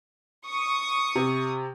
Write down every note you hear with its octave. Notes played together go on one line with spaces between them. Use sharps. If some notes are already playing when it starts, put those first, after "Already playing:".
C#6 D#6
C3